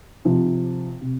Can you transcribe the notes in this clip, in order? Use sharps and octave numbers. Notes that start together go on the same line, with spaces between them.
C3 F3
C3